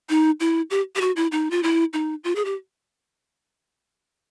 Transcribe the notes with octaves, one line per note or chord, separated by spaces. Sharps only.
D#4
E4
G4
G4
F#4
E4
D#4
F4
E4
D#4
F4
G#4
G4